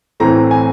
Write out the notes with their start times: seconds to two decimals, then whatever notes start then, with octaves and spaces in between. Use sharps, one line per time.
0.20 A2 E3 A3 C4 A#5
0.51 G#5